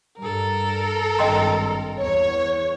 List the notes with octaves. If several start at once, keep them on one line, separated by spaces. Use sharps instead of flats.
G2 A4 A#4
G#1 G2 D#5 G5 C6
E2 C#5